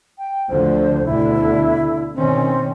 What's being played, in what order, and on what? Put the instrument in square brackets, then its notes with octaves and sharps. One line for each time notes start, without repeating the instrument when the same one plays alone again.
[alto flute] G5
[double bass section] D2 D3 F3 [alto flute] C5
[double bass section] D2 B2 D3 [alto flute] E4
[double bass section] B2 D#3 C#4 [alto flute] C4